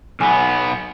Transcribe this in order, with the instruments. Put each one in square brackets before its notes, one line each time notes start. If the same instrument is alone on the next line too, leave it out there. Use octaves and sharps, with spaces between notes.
[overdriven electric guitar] B1 B3 [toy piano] G#5